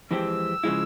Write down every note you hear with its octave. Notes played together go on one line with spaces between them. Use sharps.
F2 E3 G#3 C4 G4 E6
C#3 F3 G#3 E4